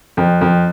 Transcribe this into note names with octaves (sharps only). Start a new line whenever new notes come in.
F2
F2